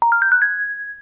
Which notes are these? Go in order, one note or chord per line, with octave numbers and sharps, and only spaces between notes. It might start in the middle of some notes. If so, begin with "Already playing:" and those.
A#5
F6
G6
F#6
G#6